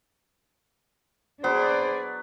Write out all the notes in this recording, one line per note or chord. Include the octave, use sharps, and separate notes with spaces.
F#3 B3 D4 G#4 C5 D5